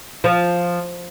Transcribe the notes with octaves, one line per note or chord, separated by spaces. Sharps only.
F3